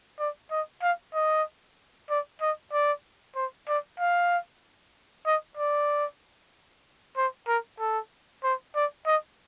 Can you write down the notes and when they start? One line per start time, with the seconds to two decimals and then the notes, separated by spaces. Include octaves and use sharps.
0.19 D5
0.51 D#5
0.82 F5
1.14 D#5
2.10 D5
2.41 D#5
2.73 D5
3.36 C5
3.68 D5
3.99 F5
5.26 D#5
5.58 D5
7.17 C5
7.48 A#4
7.80 A4
8.44 C5
8.76 D5
9.07 D#5